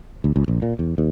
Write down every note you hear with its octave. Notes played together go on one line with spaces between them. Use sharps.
D2
C#2
A#1
A#2
E2
D#2